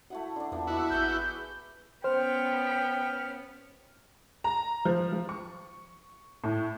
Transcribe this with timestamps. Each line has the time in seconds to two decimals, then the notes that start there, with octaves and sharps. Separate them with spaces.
0.10 A3 E4 F#4 F#5
0.36 D3 D4
0.52 E2 A#3 B3 F4 A4
0.67 E4 F#4 D5 D#5
0.90 A1 G#4 B4 E5 G6
2.04 B3 C#4 C5 G5 F6
4.44 A#5
4.85 F3
5.12 F3
5.29 C#6
6.44 A2